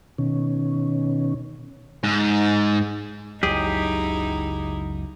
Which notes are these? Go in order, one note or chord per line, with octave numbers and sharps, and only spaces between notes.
B2 D#3 C#4
G#2
F#1 C#2 F#3 D#4 E4 G4 G#4